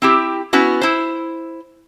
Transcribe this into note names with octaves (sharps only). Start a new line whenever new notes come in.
C4 E4 G4
B3 C#4 E4 F#4
E4 C5